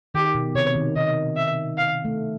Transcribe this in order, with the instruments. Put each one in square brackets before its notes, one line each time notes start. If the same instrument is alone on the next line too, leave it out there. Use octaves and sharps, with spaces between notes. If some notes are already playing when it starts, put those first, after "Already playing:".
[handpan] D#3 [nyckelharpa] G4
[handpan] B2
[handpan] C3 [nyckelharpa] C#5
[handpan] D#3
[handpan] D#3 [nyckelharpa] D#5
[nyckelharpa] E5
F5
[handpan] A3